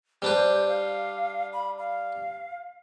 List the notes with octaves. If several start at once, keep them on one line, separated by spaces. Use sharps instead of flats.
G3 D4 B4 C5
F5
B5
F5